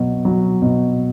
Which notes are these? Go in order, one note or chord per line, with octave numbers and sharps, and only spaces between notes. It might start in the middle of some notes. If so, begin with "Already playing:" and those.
Already playing: B2 F#3
F#3
B2